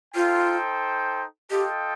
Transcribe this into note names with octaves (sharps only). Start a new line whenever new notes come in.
D#4 F4 A4 C5 G5
F4 G4 A4 D#5 G5